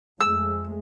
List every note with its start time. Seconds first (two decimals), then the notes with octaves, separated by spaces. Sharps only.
0.21 F2 G#3 A3 E6